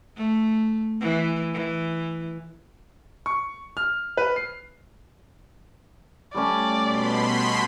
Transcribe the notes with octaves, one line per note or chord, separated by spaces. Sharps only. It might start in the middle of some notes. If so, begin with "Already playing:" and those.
A3
E3
E3
C#6
F6
B4
C7
G3 A3 C#4 D5
B2 B5 C6